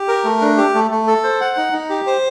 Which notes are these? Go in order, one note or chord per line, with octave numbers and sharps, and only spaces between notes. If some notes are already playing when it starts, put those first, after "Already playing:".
Already playing: G4
A#4
A3
D4
G4
A3
A3
A4
C5
F#5
D#4
D#4
G4
C5